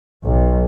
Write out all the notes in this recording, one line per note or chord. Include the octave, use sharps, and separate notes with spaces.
B1